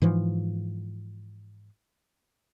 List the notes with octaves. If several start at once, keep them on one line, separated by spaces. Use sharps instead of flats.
G#2 E3 F3